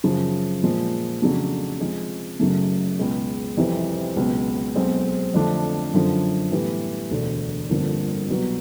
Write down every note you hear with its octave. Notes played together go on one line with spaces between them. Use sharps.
F#2 C#3 F3
A#2 F3 G#3
F2 C#3 F#3 A3 D4
C3 F3 G#3
F#1 F#2 C#3 F#3 A3
C#2 B2 G#3
F2 C3 E3 G3 C4
C#2 B2 F#3
B1 B2 G#3 C4
F2 D3 F3 A3 D4
F#2 D3 F3
A2 E3 G3 B3
E1 D2 D3
G1 F2 D3 F3 A#3
C2 B2 F#3 B3